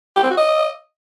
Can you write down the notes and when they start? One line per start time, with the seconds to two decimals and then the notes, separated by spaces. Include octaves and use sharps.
0.16 G4
0.23 C4
0.30 F#4
0.38 D#5